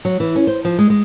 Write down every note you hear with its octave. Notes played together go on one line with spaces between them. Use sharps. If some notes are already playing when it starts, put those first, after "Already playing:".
F#3
E3
C#4
C5
F3
G#3
G#3